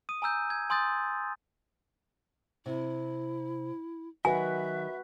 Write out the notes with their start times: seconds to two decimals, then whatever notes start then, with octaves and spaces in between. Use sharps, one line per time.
0.09 D#6 D#7
0.22 G#5 A#5 E6 G6
0.50 G#6
0.70 G#5 C6 D#6 G6 A6
2.66 C3 E4
4.25 D#3 F#3 F#4 B4 E5 F#5 G#5